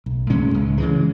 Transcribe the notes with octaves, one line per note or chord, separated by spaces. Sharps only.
B1
A2 G#3 C#4
C#2
C#3 E3 G#3